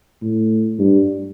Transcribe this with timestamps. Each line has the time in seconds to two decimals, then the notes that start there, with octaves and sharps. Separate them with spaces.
0.22 A2
0.79 G2